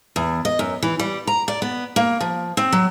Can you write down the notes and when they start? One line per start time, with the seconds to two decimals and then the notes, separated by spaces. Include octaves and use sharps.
0.16 E2
0.45 D#5
0.59 F#2
0.83 E3
0.99 G3
1.27 A#5
1.48 D5
1.62 B3
1.96 A#3
2.21 F3
2.57 C4
2.72 F#3